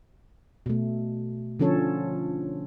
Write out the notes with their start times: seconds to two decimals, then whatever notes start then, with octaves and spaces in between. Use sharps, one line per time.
0.66 B2 A3
1.60 D3 F3 C#4 A4 C#5